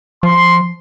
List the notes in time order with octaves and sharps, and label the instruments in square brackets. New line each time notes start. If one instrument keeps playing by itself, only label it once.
[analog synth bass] F3 [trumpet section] C6